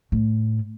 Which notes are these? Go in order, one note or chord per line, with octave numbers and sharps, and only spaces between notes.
A2